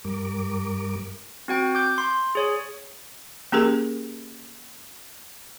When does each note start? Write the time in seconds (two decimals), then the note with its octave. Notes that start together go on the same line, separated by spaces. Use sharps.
0.05 G2 G3 A#4 D6
1.48 C4 F#4 G5
1.75 D6 G6
1.98 C6
2.35 G#4 C#5
3.52 A#3 C#4 G4 G#4 A#4